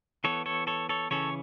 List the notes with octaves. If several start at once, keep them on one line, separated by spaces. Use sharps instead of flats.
E3 B3 A4 C#5
A4 C#5
A4 C#5
A4 C#5
C#3 E3 C#4 A4 C#5